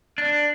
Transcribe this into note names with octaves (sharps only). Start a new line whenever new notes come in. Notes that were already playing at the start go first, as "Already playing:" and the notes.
D4